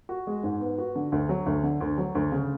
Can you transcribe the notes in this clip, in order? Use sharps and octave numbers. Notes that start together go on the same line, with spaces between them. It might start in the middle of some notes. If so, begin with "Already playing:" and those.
F#4
G#3
G#2
B3
F#4
D3
D2
F#3
D2
D3
D2
F#3
D2
C#3